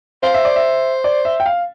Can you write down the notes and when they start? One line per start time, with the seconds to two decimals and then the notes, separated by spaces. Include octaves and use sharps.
0.23 C5 F5
0.34 E5
0.45 D5
0.56 E5
1.04 D5
1.25 E5
1.40 G5
1.46 F5